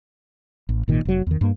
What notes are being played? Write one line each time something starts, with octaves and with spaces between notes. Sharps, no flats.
A1
G#1 A#2 D#3
F1 F#3
E2 D#3
G2 A#3